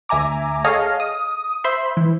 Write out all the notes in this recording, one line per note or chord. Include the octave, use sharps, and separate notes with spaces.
D2 E5 G#5 A#5 D6
G#4 A4 C#5 D#5 F5 F6
D#6
C5 E5 B5 C6
E3